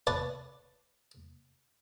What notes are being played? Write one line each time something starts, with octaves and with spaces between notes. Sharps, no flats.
B4 C#5 D5 F#5 A5